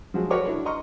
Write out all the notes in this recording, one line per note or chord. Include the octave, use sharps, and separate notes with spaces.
F3 F#3 G#3
F#4 A#4 B4 C#5 C#6 D6
D4 E4
D#5 A#5 C6 C#6 F6